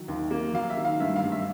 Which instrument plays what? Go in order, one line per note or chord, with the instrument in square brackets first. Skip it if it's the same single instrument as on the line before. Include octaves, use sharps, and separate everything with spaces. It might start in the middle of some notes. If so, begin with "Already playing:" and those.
Already playing: [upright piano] D#3 F#3
D#2
A#3
F#3 F5
E5
D#3
F5
G2 E5
F5
G2
E5